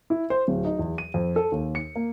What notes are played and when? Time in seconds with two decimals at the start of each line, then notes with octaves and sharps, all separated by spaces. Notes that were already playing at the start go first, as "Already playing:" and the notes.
0.10 E4
0.30 C5
0.48 D1
0.65 D#4
0.79 E2
0.98 D#7
1.14 F2
1.36 A4
1.52 D#2
1.75 C#7
1.96 A#3